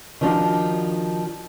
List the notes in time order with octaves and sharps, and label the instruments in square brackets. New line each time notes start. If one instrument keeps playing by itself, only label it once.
[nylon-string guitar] D#3 F3 D4 F#4